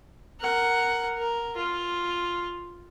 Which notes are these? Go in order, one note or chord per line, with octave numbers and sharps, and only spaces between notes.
A#4 F#5
A#4
F4